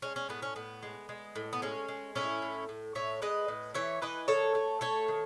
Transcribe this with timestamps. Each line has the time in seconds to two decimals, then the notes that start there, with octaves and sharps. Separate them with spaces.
0.02 G#3 C#4
0.16 C#4
0.29 A2 B3
0.42 C#4
0.56 A2 B3
0.83 G#3
1.09 G#3
1.35 A2
1.53 B3
1.62 G#3 C#4
1.88 G#3
2.15 A2 C#4 E4
2.42 A2
2.69 A2
2.95 A2 C#5 E5
3.22 G#3 B4 D#5
3.48 A2
3.74 E3 C#5 E5
4.02 E3 B4 D#5
4.28 D#3 A4 C#5
4.55 A3
4.81 A3 A4 C#5
5.08 D#3